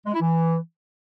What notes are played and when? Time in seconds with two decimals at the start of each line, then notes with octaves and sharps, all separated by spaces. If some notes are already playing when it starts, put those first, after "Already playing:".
0.06 G#3
0.13 E4
0.21 E3